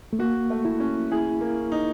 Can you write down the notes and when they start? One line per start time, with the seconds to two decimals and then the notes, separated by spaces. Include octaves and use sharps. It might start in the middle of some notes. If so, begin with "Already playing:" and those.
0.13 A3
0.19 A#3 F#4
0.50 A3
0.65 E4
0.80 C#4
1.12 E4 G#4
1.41 A#3
1.72 D#4